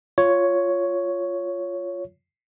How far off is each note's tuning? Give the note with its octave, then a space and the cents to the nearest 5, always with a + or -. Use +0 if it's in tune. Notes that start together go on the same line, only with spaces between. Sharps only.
F4 +0 C#5 +5